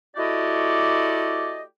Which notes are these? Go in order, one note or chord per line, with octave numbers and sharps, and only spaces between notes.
A3 E4 F#4 G4 D5 D#5